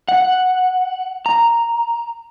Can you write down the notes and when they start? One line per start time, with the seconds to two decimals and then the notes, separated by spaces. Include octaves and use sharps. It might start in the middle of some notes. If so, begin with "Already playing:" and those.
0.08 F#5
1.26 A#5